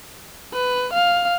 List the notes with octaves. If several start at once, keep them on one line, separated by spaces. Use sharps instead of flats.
B4
F5